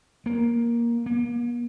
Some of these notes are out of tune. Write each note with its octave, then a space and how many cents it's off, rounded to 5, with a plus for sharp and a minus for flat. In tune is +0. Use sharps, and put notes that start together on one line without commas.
A#3 +10
A#3 +45